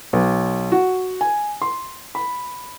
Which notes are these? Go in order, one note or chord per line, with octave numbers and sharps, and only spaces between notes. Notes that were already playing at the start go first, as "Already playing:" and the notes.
B1
F#4
G#5
C6
B5